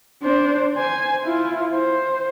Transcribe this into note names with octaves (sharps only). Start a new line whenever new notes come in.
D4 C5
C5 G#5
E4 F4
C5